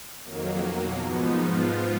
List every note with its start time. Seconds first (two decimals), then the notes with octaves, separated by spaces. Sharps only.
0.24 F2 D#3 F#3 A#3
0.62 B2 F#3 A#3
1.00 G#2 F3 B3 D#4
1.38 G#2 F3 B3 F4